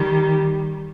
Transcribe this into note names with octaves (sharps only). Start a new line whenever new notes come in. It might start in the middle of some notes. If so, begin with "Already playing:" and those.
Already playing: D#3 G3